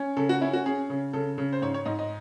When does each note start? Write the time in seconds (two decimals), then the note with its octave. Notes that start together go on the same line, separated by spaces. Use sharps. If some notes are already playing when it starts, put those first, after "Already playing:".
Already playing: C#4
0.17 C#3 A4
0.29 F#4
0.41 C#4 E4
0.53 F#4
0.66 C#4 G#4
0.90 C#3
1.13 C#3 A4
1.38 C#3
1.53 C5
1.62 G#2 C#5
1.74 C#5
1.85 G#2 D#5
1.99 D#5